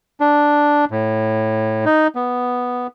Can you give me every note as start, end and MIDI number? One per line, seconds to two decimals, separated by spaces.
0.20 0.85 62
0.91 1.85 45
1.86 2.07 63
2.15 2.87 59